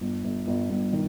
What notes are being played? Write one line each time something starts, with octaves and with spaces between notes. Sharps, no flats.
G1
G1
G1
G1
D#3